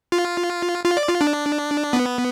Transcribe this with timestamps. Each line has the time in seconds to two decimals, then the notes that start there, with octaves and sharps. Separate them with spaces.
0.12 F4
0.85 F4
0.97 D5
1.09 F4
1.21 D4
1.93 B3